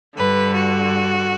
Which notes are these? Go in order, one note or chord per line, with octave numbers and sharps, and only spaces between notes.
G2 D3 B4
F#4